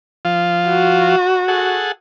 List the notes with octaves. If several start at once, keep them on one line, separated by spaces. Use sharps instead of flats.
F3 F4
F#4
G#4 A4 F#5